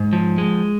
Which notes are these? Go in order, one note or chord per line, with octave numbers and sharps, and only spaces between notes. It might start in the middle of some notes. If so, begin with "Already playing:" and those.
Already playing: G#2
F3
G#3